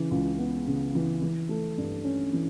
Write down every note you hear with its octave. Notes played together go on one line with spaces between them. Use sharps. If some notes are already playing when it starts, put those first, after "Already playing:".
Already playing: C#3 E3
C#2
B3
C#3
E3
E3
A3
G2
C#4
E3